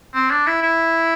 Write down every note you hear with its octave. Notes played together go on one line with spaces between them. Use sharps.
C4
D4
E4
E4